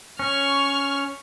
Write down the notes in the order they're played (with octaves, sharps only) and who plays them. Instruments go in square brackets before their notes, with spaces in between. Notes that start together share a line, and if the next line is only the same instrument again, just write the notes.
[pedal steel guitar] C#4 [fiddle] C#6 F6